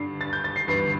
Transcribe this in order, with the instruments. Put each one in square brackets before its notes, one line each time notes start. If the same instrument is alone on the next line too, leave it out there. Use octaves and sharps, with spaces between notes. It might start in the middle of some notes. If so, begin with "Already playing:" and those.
Already playing: [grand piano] G2 D3 G3 D4 C7
A6
G6
A6
C7
G1 G2 E3 C7